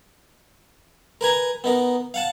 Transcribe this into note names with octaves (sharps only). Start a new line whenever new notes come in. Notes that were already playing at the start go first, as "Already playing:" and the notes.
A#4 B4 G#5 A#5
B3 D#4 A#4
F5 F#5 A5